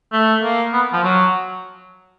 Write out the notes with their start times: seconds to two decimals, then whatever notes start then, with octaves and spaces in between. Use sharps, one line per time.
0.13 A3
0.43 A#3
0.73 B3
0.93 F3
1.03 F#3